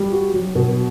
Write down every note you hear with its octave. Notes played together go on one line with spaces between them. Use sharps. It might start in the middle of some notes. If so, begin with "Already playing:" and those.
Already playing: G3
F#4
F#3
B2